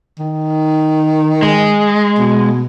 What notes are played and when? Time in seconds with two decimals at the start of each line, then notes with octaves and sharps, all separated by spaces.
0.19 D#3
1.43 G#3
2.18 B2